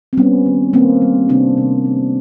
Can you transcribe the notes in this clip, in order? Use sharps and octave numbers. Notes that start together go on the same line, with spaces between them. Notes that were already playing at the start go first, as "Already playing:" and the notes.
C4
G3 B3 C#4
D#3
D#3 A#3 C4
G3
C3 C4 D4
C3
A3